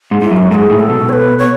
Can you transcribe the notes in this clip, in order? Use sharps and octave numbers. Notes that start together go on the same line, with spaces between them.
G#2
G#2 E4
F#2
F#4
G#2 G#4 A4
A2
A4
B2
C#5
B4
C#5